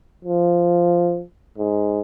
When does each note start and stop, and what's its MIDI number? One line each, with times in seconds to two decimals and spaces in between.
0.25 1.22 53
1.58 2.00 44